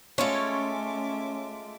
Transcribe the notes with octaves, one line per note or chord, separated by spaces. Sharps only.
G#3 A3 C#4 F4 A4 C#5 E5 D6